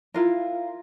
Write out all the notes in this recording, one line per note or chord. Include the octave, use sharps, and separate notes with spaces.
E4 F4 A#4